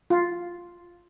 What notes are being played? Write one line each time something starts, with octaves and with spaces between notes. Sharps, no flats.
F4